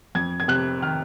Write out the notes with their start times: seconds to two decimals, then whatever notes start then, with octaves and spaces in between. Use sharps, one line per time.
0.15 F2 G#6
0.40 G#6
0.48 C3 F#6
0.82 D#3 F6